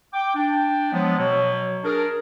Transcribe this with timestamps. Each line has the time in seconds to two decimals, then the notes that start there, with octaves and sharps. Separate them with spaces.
0.14 G5 D6
0.35 D4 G5
0.92 F3 F#3 G#3 B3
1.18 B2 F#3 C#5
1.84 D4 G#4 A#4